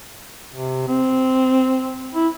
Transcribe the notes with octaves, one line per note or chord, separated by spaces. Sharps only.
C3
C4
E4